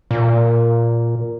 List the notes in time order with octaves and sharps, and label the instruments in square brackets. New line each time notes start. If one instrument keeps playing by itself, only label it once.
[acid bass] A#2